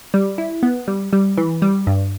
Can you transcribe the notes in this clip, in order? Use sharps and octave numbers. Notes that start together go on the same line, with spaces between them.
G3
E4
B3
G3
G3
E3
G3
G2